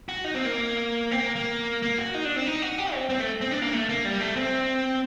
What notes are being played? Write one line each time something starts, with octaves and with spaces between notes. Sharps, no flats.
F#4
D#4
C4
A#3
C4
A#3
A#3
A#3
F#4
D#4
D4
C4
D#4
F#4
G4
C4
C4
A3
C4
D4
A#3
A3
A#3
G3
A3
C4